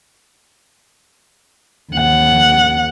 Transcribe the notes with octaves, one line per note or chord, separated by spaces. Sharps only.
D#2 F#5